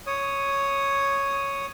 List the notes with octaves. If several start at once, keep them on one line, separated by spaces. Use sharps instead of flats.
C#5 D#6